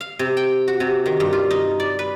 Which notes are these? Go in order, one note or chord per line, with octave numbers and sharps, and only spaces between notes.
F5
C3
G5
F#4
C3
D#3
G2
F4
D#4
D5
B4